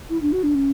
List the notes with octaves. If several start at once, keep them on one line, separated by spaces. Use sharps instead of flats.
E4
D4
F#4
D4
C#4